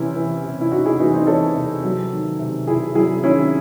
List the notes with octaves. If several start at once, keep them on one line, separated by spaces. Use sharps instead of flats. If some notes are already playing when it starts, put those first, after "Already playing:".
Already playing: C3 E3 C#4 E4
E3
C3
E4
C3 D#4 F#4
E4 G#4
E3 D#4 F#4
C4 D#4
E3 A4 C#5
C3
F#3
D#3
C3
C3 E4 G#4
F#3 E4 G#4
D#3 C#4 E4